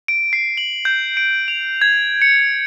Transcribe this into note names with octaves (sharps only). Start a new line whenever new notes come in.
D7
C7
F#7
G6
D7
F7
G#6
C#7